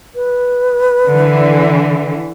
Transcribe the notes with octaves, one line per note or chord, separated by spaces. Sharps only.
B4
D3 E3